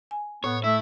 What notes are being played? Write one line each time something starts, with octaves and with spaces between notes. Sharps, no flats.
G#5
A2 B3 C#5
A3 E4 E5